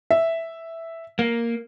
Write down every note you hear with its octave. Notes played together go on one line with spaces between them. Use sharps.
E5
A#3